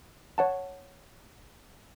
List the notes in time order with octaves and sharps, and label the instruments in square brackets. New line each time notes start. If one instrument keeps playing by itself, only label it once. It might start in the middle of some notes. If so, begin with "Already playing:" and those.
[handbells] C#5 F#5 A5